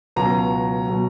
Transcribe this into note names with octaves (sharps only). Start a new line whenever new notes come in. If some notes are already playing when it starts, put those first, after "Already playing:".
C#2 B2 F#3 A#5
B2 F#3